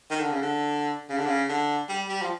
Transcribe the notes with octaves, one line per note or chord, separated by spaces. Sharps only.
D#3
D3
C#3
D3
C#3
D3
C#3
D3
G3
G3
F3